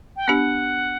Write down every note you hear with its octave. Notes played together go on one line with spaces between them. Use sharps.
G5
B3 D4 G4 F#5